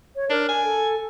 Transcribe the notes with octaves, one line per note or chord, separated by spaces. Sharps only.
C#5
D4 A#4
G#5
A4